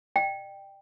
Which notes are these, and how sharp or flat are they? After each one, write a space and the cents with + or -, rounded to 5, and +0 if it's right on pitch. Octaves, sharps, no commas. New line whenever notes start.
D5 +45 G5 +0